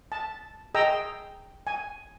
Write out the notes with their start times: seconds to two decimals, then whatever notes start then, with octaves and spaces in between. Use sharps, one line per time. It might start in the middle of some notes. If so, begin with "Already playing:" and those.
0.12 A5
0.74 G#4 D#5 G5 A#5 E6
1.67 G#5